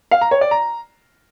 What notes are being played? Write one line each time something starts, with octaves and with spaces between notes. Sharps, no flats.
F5
A#5
C#5
D5
A#5